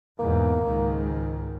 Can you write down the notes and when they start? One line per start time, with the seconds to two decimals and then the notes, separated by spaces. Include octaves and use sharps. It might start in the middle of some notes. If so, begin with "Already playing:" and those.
0.19 E2 G#2 B2 A#3
0.63 C#2 G#2 D#3